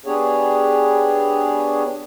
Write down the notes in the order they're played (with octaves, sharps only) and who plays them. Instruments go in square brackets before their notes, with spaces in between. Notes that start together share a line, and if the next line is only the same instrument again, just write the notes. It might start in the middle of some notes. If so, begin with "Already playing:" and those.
[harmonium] B3 D4 G4 G#4 C#5